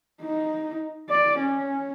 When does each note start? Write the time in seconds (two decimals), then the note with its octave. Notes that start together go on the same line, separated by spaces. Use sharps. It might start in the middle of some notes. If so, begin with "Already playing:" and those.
0.21 D#4
1.10 D5
1.39 C#4